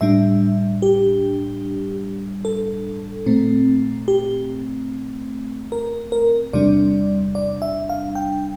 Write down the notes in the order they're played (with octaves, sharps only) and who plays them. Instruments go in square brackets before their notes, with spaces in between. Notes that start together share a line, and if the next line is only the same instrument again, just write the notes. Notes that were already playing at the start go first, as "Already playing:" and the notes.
[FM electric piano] A2 G3 D4 E5
G4
A4
A#2 A3 C4
G4
A#4
A#4
E2 C3 G3 D4 D5
D5
E5
F5
G5